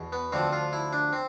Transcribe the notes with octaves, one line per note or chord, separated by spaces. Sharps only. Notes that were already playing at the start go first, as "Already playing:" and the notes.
Already playing: E2 B2
B3
D2 D3 F3 C4
F4
E4
D4
C4